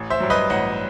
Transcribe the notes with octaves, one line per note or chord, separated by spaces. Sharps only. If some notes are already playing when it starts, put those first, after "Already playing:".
Already playing: A1
C5 E5
G2 F#3
B4 D#5
A1 D#5 F#5